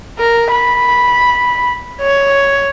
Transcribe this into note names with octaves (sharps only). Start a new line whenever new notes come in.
A#4
B5
C#5